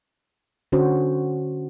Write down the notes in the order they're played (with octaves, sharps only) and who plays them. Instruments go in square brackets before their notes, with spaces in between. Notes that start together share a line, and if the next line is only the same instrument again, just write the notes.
[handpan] D3 C#4 F#4 C5